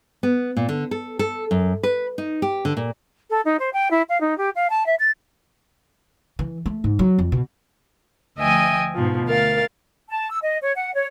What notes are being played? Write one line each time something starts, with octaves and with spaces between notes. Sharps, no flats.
B3
A#2
D3
A4
A4
F#2
B4
D#4
G4
D3
A#2
A4
D#4
C5
G5
E4
F5
D#4
G4
F5
A5
E5
A6
E3
A3
G#2
F#3
F2
B2
D2 F3 D#5 E5 G5 G#5
G#2 B2 F3
D2 A#4 F5 A6
A5
E6
D#5
C#5
F#5
C#5